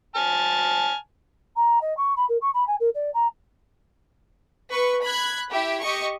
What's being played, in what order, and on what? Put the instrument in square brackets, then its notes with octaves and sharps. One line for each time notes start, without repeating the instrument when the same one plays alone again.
[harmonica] G#5 A5 F6
[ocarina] A#5
D#5
C#6
B5
A#4
C#6
B5
G#5
A#4
D5
A#5
[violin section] B4 C#6
B5 F#6 G#6
E4 G4 E5
G4 D#5 C#6